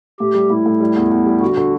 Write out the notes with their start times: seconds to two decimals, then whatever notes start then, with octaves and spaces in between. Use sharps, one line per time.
0.20 A2 G4
0.34 G3
0.50 A2 E4
0.66 A2
0.80 G3
0.96 E2
1.11 E2
1.26 G3
1.41 D3 F#4
1.57 D3